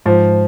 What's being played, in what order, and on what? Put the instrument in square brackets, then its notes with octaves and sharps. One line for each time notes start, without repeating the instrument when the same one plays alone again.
[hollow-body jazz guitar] G#2 [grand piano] F3